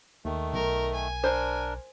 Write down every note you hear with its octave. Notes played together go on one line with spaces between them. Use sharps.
D#2 D#3 A3
B1 A#4
G#5
D4 A#4 C5